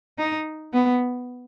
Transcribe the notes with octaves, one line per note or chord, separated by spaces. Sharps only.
D#4
B3